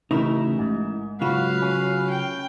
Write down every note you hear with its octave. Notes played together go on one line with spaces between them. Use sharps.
A1 C#3 D#4 E4 A#4
G#2
C#3 F#3 F4 F#4 B4 F5
C#4
G5